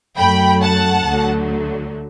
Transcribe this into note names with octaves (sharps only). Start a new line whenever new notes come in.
F#2 F#3 A3 G5 B5
F#5 A5
D2 D3 F#3 A3